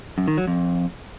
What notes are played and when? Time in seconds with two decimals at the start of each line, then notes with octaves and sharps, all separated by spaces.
0.18 F#2
0.28 D#3
0.37 F#3
0.47 F2